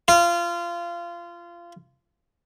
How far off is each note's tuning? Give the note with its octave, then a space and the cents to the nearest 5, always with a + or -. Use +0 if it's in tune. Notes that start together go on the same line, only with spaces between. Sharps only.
F4 -25